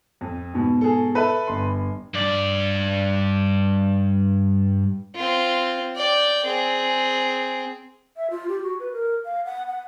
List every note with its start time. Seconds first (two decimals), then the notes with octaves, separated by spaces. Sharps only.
0.21 F2
0.54 G#2 B2
0.81 G#4 A4
1.15 A4 B4 E5
1.48 G1 C6
2.15 G2 D5
5.16 C4 F4
5.96 D5 G5
6.45 C4 G#4
8.17 E5
8.30 F4
8.49 G4
8.63 F#4
8.80 B4
8.93 A#4
9.25 F5
9.45 F#5
9.67 F#5